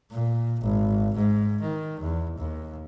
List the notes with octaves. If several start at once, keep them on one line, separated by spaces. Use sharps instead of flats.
A#2
G#1
G#2
D#3
E2
D#2